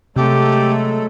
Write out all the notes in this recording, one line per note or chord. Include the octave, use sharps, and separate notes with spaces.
C3 F#3 G#3 A3 G4 A4